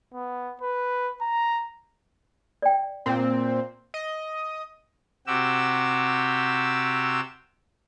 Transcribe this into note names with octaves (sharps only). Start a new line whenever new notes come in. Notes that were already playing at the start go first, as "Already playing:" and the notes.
B3
B4
A#5
D5 G5
A#2 C4
D#5
C3 F#4 G4 E6